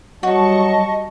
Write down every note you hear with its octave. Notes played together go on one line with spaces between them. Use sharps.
F#3 G3 F#4 D#5 A5 C#6